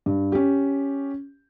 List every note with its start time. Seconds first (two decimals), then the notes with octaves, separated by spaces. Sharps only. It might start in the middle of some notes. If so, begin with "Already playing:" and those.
0.06 G2
0.32 C#4 G4